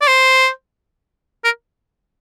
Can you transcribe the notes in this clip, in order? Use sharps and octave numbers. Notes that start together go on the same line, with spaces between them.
D5
C5
A#4